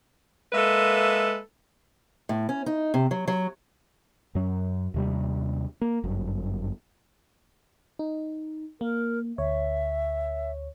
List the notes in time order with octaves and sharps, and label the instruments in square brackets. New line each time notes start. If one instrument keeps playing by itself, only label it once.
[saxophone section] G#3 A#3 A4 B4 E5
[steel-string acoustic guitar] A2
C#4
D#4
C3
F#3
F#3
[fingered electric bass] F#2 F#3
D#2 C3 G3
A#3
G1 F#2
[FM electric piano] D#4
[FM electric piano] A#3 [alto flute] A#4
[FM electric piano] D2 C#5 [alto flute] E5